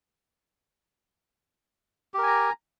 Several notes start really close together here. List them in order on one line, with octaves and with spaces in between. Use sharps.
G4 A#4 G#5 A#5